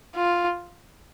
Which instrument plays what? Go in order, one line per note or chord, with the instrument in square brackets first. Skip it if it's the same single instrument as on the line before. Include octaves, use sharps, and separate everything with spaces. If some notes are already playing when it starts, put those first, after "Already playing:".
[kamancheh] F4